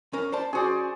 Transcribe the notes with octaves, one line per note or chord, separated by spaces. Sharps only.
C#4 A#4
C5 D5 A5
C#4 F#4 G#4 C5 D5